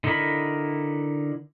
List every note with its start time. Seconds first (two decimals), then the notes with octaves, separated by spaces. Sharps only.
0.04 D3 D#4 E4 A#4 B5